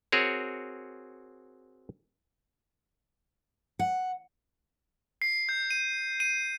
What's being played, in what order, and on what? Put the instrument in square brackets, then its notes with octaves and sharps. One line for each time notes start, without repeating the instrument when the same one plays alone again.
[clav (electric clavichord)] C4 F#4 G#4 A#4 C#5
[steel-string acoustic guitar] F#5
[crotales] C7
G6
D#7
D#7